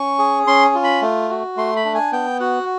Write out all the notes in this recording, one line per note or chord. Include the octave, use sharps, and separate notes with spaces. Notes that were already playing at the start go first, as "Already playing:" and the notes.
Already playing: C#4 C#6
G#4
C#4 C6
F4
B5
A3
F#4
A3 C6
B5
D4
G#5
B3 G5
F#4 F#5